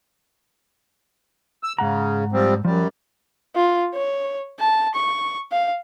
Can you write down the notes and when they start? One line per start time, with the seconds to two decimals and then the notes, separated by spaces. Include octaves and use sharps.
1.63 E6
1.78 G#2 C#3 F#5 A#5
2.32 F3 G3 C4
2.65 F#2 F3 G3
3.55 F4
3.94 C#5
4.59 A5
4.95 C#6
5.51 F5